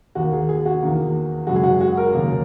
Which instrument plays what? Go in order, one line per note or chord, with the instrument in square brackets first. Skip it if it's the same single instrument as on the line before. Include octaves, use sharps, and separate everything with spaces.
[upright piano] D#2 D#3 A#3 F#4
G#4
G#4
F#4
E2 D#3 A#3
F#2 C#3 G#3 F#4
G#4
F#4
F#4
A#4
D#2 C#3 F#3 A#3